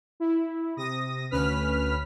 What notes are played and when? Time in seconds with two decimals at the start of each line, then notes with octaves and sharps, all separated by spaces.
0.20 E4
0.77 C3 D#6 A#6
1.31 D2 C#4 B4 F6 B6